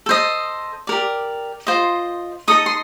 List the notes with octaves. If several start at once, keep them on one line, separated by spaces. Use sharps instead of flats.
A4 C5 D#5
G4 A#4 D5
F4 C5 D#5
D#4 A4 D#5 D#6
C6